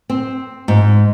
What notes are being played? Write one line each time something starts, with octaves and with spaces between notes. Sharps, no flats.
C4
G#2